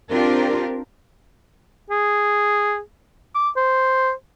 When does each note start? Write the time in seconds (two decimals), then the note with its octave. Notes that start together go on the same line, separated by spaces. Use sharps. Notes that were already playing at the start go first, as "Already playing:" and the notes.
0.11 C4 D4 F4 G4 A#4
1.91 G#4
3.35 D6
3.57 C5